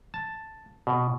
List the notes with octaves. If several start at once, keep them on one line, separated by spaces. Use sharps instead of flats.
A5
B2